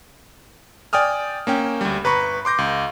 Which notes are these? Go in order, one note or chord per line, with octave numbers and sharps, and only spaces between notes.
D5 G5 G#5 D#6 F6
A#3 C#4 G5
D2 G3
G1 B4 A#5 B5 C#6
C6 D6 G6 A#6
C#2